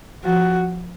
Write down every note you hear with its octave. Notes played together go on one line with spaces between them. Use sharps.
F3 F#4